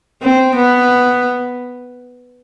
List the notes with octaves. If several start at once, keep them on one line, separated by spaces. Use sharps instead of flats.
C4
B3